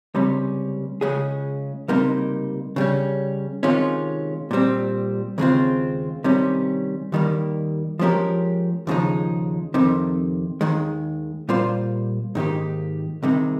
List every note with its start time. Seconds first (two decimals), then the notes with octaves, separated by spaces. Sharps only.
0.15 C#2 C3 G3 C#4
1.01 C#2 C#3 G#3 C#4 G#4
1.88 C#2 C3 G3 A#3 D#4
2.76 C#3 G3 C#4
3.63 C3 D#3 G#3 C#4 F4
4.51 A#2 G3 C4
5.38 D#2 C#3 G#3 C4 F4
6.24 C3 D#3 G3 C#4
7.12 D#2 D#3 G3 A#3
7.99 F3 G#3 C#4 G4 A#4
8.87 D#2 C#3 F3 G#3 D#4
9.74 F2 C3 D#3
10.61 D#2 D#3 G#3
11.49 A#2 G3 A#3 F4 C5
12.35 G#2 D#3 A#3 D#4 G4
13.23 C2 C3 D#3 G#3